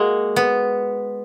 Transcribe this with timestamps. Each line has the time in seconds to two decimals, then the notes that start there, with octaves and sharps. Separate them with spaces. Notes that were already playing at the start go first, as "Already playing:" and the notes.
Already playing: G#3 A#3 F#4
0.36 B3